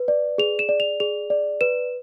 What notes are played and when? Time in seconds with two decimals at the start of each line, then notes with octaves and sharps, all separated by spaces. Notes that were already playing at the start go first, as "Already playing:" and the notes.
Already playing: B4
0.08 D5
0.38 G#4 F7
0.59 E7
0.69 D5
0.80 F7
1.00 G#4 F7
1.30 D5
1.61 B4 E7